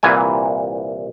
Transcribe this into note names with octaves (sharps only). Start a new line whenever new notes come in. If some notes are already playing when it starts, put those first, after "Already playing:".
C2 A#2 E3 G#5